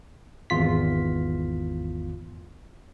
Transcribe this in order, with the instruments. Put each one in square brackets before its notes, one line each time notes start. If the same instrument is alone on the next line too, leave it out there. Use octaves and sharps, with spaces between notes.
[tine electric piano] G#1 E2 F4 B6